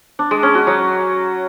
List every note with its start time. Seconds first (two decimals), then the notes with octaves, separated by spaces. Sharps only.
0.19 D4
0.31 G#3
0.43 C#4
0.55 F#4
0.67 F#3